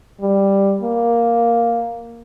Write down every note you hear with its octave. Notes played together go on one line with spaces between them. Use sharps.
G3
A#3